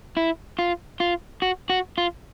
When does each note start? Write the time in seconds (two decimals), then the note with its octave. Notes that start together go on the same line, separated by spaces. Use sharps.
0.17 E4
0.59 F4
1.00 F4
1.42 F#4
1.70 F#4
1.98 F4